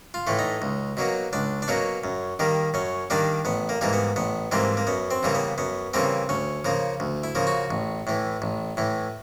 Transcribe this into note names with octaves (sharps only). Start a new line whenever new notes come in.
F4
A2 E3 A3
D#4
C#2
B2 F#3 A#3
C#2 D4
D4
B2 F#3 A#3 C#4
F#2
D#3 G3 A#3
F#2 C#4
D#3 G3 A#3 D4
A1 B3
A#3
G#2 E3 G3 A#3
B3
A1 B3
G#2 E3 G3 A#3 C4
A#3
F#2 B3
C4
C#3 E3 G3 A#3
B3
F#2 B3
C#3 E3 G3 A#3 C4
D2 C#4
C#3 F3 A#3
D2
E4
C#3 F3 A#3
F#4
A1
A2 E3
A1
A2 E3